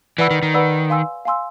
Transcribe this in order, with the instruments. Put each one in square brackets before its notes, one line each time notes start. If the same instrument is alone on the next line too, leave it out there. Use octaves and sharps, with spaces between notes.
[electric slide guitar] E3 [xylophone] B4 D5 F#5 B5 E6
[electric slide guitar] D#3
D#3
[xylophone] B4 D5 F#5 B5 E6
F5 G#5 C6 E6
F5 G#5 C6 E6